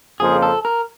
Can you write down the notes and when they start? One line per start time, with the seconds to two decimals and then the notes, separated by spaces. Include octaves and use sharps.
0.20 F2 C#3 F3 A#3 G#4
0.42 A4
0.65 A#4